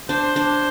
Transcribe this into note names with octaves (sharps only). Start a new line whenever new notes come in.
D4 C5
D4